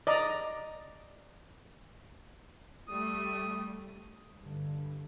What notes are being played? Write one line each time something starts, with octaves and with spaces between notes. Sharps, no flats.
D5 D#5 A#5
G3 A3 D#6
G2 D3